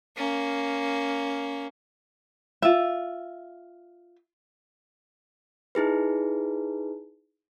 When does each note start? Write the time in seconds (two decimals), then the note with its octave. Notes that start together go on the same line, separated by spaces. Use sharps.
0.16 A#3 C#4
2.62 F4 E5
5.75 D#4 E4 G#4 B4